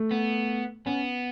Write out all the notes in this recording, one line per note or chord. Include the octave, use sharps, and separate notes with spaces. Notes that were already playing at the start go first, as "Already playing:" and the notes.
Already playing: A3
B3
B3 C#4